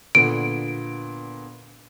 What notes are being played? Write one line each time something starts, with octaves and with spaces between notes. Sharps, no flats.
A#2 D3 B3 D7